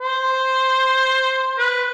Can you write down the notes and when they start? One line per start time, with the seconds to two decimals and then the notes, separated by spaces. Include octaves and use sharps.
0.01 C5
1.58 B4